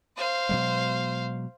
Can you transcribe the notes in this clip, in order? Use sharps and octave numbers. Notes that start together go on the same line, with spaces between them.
C5 F5
B2 F#3 G#3